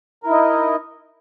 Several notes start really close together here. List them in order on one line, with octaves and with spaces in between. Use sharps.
A#4 E4 D#4 D#5